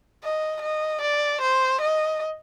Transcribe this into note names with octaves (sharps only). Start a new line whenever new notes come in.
D#5
D#5
D5
C5
D#5